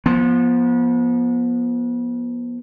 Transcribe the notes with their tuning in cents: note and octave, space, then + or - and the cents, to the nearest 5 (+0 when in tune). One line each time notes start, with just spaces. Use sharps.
F3 +0 B3 -35